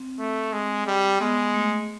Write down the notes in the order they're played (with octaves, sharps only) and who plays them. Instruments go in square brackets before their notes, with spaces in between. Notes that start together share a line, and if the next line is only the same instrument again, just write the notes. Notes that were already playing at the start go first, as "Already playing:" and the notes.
Already playing: [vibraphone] C4
[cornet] A3
G#3
G3
[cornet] G#3 [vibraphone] B3
[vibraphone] A3